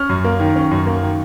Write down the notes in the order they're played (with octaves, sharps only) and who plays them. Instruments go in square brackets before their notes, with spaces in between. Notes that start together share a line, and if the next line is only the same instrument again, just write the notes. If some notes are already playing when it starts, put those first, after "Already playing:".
Already playing: [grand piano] C#4 F6
F#2
A#3
D#3
C#4
F#2
A#3
D#3